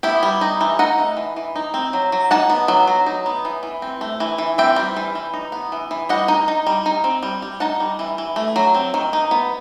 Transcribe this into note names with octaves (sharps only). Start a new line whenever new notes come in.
B3 E4 G4
G3
D#4
E3
D#4 D#5 F#5
A3
E3
E3
D#4
C4
F#3
F#3
D#4 F#5 A5
B3
F#3
F#3
D#4
B3
E3
E3
C4
A3
E3
E3
C4 E5 G5
G3
E3
E3
D#4
B3
E3
E3
G3 D#5 F#5
D#4
D#4
G3
D#4
C4
G3
G3
D#4 F#5 A5
G3
E3
E3
A3
F#3
C4
D#3
D#4
B3